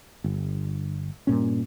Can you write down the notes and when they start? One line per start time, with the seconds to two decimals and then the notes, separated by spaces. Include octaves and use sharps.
0.24 G1
1.27 G2 A#2 C#4